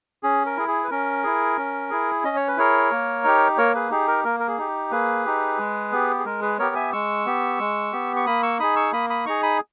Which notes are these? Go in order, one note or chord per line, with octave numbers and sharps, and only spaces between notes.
C#4 G#4
A#4
E4 G#4
G#4
B4
C#4 A#4
E4 G#4
C#4
E4 G#4
C#4 D#5
C#5
B4
E4 G#4 A#4 C#5
A#3
D#4 G4
A#3 A#4 C#5
G#4 B4
D#4 G4 G#4
A#4
A#3 A#4
A#4
G#4
D#4 G4
A#3 G#4 B4
D#4 G4
G#3
B3 G4
G#4
G#3 A#4
G#4 B4
B3 G4 A#4 C#5
E5 G#5
G#3 C#6 E6
B3 G4
G#3
B3 G4
C#6
A#3 B5 D#6
C#6 E6
D#4 G#4 B5 D#6
C#6 E6
A#3 B5 D#6
B5 D#6
D#4 G#4 A#5 C#6
B5 D#6